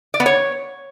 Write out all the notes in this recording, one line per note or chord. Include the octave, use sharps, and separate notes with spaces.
D5
B3
C#5